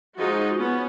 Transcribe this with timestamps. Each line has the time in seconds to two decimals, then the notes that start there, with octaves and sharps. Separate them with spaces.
0.16 F3 G#3 D#4 F4 F#4
0.57 B3 C#4